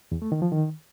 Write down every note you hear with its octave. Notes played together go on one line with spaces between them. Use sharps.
E2
A3
D#3
F3
D#3